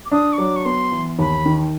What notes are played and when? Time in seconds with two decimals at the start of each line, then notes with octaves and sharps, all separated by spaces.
0.05 D6
0.11 D4 D#6
0.33 C#6
0.38 F#3 D6
0.56 C#6
0.65 B3 C6
0.92 E3
1.19 D#2 B5
1.45 D#3